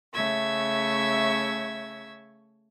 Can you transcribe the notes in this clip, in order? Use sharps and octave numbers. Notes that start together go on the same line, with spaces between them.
C#3 A3 E5 C#6 E6 G#6